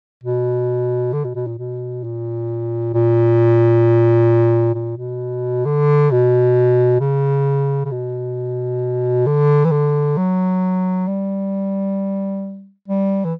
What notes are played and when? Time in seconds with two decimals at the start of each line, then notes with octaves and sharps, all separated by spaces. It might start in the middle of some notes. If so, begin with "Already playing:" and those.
0.24 B2
1.13 D3
1.24 B2
1.35 B2
1.47 A#2
1.58 B2
2.04 A#2
2.94 A#2
4.75 A#2
4.97 B2
5.65 D3
6.11 B2
7.00 C#3
7.85 C#3
7.91 B2
9.26 D3
9.65 E3
9.71 D3
10.17 F#3
11.07 G3
12.88 G3
13.25 E3